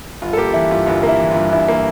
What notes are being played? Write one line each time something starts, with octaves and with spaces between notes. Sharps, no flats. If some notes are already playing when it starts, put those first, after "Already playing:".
G1 F4
A4
A#3 G4
E3 E4
G2 F4
G1 F4
A#3
E4
E3
G2 F4
G1 E4
A#3